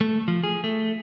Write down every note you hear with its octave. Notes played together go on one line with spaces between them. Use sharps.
A3
F3
G#4
A3